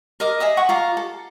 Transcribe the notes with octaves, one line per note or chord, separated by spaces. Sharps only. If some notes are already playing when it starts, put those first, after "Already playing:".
A#4 D#5 D6
G#4 D#5 E5 D#6
F#5 C#6 D#6
F4 A#5 D6
A4